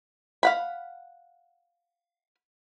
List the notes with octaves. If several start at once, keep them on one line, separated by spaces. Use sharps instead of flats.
F5 F#5 B5